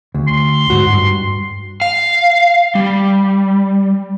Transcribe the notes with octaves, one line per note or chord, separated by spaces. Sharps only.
D2
C6
G#2 F#4
G2
F5
G3